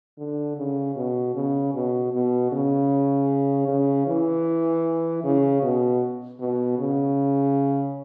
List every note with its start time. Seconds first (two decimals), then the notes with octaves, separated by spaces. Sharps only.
0.18 D3
0.57 C#3
0.95 B2
1.35 C#3
1.74 B2
2.13 B2
2.52 C#3
3.68 C#3
4.07 E3
5.24 C#3
5.62 B2
6.40 B2
6.79 C#3